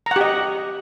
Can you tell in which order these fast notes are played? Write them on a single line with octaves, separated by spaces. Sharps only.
A#5 F#5 G4 D#5